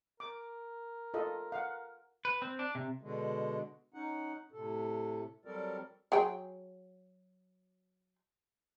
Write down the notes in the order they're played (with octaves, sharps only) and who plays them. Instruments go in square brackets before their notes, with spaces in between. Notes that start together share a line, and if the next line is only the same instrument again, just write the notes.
[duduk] A#4 [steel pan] D6
[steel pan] F4 A4 D#5
F5 F#5
[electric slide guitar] B4
C4
D4
C3
[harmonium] B2 D3 G#3
C#4 D#4 F#5
A2 C3 A4
F#3 G3 C4 A4 A#4 D5
[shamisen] F#3 G#4 G5